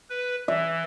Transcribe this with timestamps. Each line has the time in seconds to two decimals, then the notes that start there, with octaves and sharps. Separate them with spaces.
0.10 B4
0.48 E3 E5